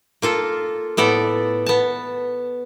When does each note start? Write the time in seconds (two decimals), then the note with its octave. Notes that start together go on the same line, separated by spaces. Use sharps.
0.22 A#3 F4 A4
0.97 A2 B3 A4 D5
1.66 B3 A5